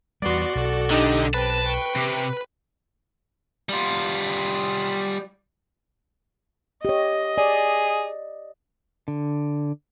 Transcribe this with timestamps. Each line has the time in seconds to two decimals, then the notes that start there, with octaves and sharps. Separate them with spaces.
0.22 E2 G3 B3 F#4 D5 C6
0.55 B1 A4
0.91 D3 D4 D#4 G4 D#5
1.34 C4 G4 B4 A5
1.64 G5 C#6
1.96 C3
3.69 G3 F4
6.85 G4 C#5 D#5
7.38 G#4 D5
9.08 D3